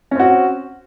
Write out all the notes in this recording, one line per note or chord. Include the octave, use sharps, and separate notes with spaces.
C4 C#4 F#4